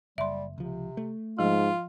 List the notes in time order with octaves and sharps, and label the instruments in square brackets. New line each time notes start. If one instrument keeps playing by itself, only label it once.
[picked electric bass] F#1 [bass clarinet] G3 [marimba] E5 C6
[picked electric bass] C#2 F3 [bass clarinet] C3
[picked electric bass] A3
[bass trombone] G#2 [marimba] F3 [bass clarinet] F4